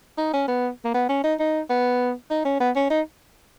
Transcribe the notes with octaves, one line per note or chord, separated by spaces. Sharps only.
D#4
C#4
B3
A#3
B3
C#4
D#4
D#4
B3
D#4
C#4
B3
C#4
D#4